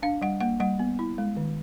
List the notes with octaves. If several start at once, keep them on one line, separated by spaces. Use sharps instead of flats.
D4 F5
G3 F#5
A#3 F#5
G3 F#5
B3
E4
G#3
D#3